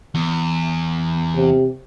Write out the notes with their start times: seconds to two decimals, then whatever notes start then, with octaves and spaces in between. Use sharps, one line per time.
0.15 E2
1.36 C3